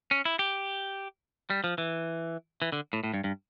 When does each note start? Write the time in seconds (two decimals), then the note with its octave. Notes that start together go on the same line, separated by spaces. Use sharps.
0.11 C#4
0.25 E4
0.39 G4
1.50 G3
1.64 F3
1.78 E3
2.62 E3
2.72 D3
2.93 A2
3.03 A2
3.14 G2
3.24 G2